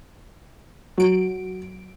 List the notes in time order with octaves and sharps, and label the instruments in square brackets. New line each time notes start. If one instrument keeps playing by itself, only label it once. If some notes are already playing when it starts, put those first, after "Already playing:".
[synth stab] F#3 D7 [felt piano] F#4